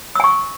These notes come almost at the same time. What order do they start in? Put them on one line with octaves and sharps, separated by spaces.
E6 G#5 C#6